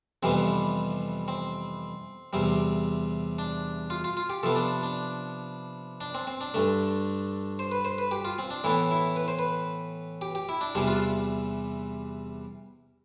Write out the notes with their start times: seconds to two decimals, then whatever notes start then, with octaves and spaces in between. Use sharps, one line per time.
0.23 F2 C3 E3 G3 B3 C4
1.28 C4
2.33 E2 C3 G3 C4
3.39 D4
3.90 F4
4.04 F4
4.17 F4
4.30 G4
4.43 C3 F3 B3 A4
4.56 D4
4.83 D4
6.01 D4
6.15 C4
6.27 C4
6.41 D4
6.54 G2 D3 A3
7.59 C5
7.71 B4
7.85 C5
7.98 B4
8.11 G4
8.25 F4
8.38 C4
8.50 D4
8.64 A2 E3 B3 E4
8.91 E4
9.16 B4
9.28 C5
9.39 B4
10.21 G4
10.35 G4
10.49 E4
10.61 D4
10.75 E2 C3 E3 G3 D4
10.87 F4